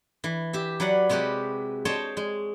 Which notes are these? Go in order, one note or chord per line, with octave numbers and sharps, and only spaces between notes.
E3
G4 E5
F#3 B4 D5 F#5
C3 G#3 F#4 G4 B4
C5 C#5 D#5 G5 A5
G#3